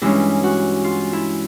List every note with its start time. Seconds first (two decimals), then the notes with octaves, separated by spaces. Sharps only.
0.02 G2 E3 G#3 C#4 E4
0.43 F#4
0.84 F4
1.13 E4